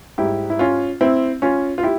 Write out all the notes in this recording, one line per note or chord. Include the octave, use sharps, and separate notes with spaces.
G#2 G3 E4 G4
E4
C#4 F4
C4 E4
C#4 F4
F4
E4 G4